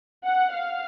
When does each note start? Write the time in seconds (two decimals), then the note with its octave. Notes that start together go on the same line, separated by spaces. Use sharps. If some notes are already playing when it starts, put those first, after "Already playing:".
0.24 F#5
0.52 F5